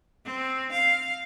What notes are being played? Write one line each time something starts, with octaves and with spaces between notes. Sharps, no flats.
C4
F5